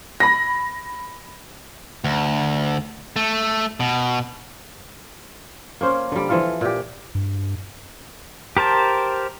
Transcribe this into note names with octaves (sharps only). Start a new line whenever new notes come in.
B5 A#6
D2
A3
B2
A#3 C#4 C5
D3 G3
E3 F3 A4 F5
A#2 G4
G2
G4 A#4 C5 A5